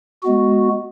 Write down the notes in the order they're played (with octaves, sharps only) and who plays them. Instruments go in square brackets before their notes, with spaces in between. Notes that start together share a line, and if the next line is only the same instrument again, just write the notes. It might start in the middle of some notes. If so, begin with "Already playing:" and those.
[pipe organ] G#3 B3 F#4